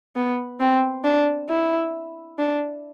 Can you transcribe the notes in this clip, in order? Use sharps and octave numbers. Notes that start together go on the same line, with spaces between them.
B3
C4
D4
E4
D4